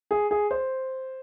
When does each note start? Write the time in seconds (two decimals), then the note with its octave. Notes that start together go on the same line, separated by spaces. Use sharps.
0.11 G#4
0.31 G#4
0.51 C5